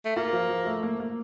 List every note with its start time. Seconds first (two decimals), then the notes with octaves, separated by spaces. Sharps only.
0.05 A3
0.16 A#3 F4
0.33 F3
0.49 F3
0.66 A3
0.83 A#3
1.00 A#3